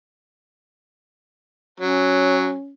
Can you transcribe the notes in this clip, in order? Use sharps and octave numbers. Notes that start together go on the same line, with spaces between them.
F#3 C#4